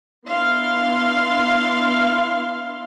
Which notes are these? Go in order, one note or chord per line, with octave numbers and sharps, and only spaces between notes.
B3 D4 E4 F5 C6